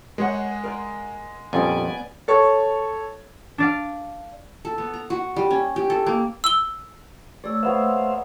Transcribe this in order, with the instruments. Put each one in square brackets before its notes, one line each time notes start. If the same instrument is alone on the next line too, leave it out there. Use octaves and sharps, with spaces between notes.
[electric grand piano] G#3 G#4 F#5 [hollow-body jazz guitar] A#4 C#5
[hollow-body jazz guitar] A#4 D5
[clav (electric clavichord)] F2 [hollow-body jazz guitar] A#2 G3 C#4 [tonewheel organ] B3 D5 G#5
[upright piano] A4 C#5
[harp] D4 D5 F5
[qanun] A4
B3
A#5
F#4
G3
C#4
G4
A4
A#3
[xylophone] E6 G7
[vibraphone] A3 G#4 E6 [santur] C#5 D5
[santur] A#3 B3 C#5 [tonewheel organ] C5 E5 F5